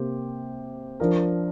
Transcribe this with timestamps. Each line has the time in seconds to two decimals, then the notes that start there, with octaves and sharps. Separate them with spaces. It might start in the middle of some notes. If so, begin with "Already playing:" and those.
Already playing: C3 A#3 G4 C5
1.00 F3 D4 A#4